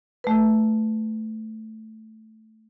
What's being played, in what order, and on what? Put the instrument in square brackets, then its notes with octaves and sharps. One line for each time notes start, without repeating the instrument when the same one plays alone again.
[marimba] A3 B4